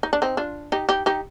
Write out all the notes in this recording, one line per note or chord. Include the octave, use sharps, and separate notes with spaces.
D#4
D4
C4 D#4
D4 F4
D#4 G4
D#4 G4
D#4 G4